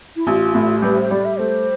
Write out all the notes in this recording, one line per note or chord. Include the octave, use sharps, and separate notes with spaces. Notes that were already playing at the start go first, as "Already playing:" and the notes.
E4
A1 F4
A2
G3 B4
C5
G3 D5
E5
A3 C5